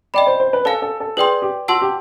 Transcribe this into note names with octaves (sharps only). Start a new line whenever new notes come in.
D5 D#5 G5 B5
C5
C5
B4
A4 C#5 F5 G#5
A4
A4
G#4 B4 D5 G5 C6
G4
F#4 F#5 A5 C6 E6
G4